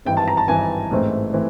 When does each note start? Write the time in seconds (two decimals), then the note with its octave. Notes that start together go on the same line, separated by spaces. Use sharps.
0.05 G#1 G2 E3 G5
0.17 A5
0.28 A#5
0.37 A5
0.48 G#1 G2 E3 G#5
0.91 A1 G#2 E3 A3 C4
1.33 E3 A3 C4